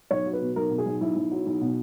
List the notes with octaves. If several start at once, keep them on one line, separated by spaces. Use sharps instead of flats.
B1 C#5
F#3
B4
B2
B1 A#4
B2
G#4
B1
B1 E4
B1
F#3
B1
B2